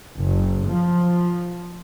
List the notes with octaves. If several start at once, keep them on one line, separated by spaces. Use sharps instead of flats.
F#1
F3